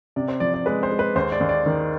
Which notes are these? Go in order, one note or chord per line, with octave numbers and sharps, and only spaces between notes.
C3 D5
C5
F3 D5
D5
G#3 B4
C5
G#3
B4
D#2 C5
D5
D#2
D5
D#3